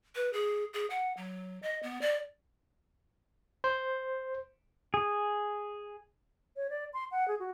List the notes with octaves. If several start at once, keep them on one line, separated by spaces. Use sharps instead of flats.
B4
G#4
G#4
F#5
F#3
D#5
B3
D5
C5
G#4
C#5
D5
C6
F#5
G#4
F#4